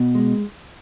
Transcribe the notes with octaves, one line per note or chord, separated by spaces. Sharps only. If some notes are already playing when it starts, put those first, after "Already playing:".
Already playing: B2
G#3